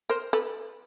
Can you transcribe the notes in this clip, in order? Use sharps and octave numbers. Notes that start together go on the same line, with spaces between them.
A#4 C5
A4 B4